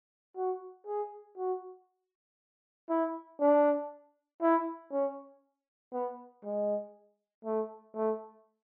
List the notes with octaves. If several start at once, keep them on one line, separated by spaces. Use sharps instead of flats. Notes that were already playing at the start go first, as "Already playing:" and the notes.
F#4
G#4
F#4
E4
D4
E4
C#4
B3
G#3
A3
A3